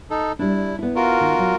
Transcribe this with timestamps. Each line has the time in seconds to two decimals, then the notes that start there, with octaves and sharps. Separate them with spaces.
0.10 D#4 A4
0.39 G3 D4 E4
0.79 B3 E4
0.96 F4 F#4 A#4
1.20 D#3
1.39 F#3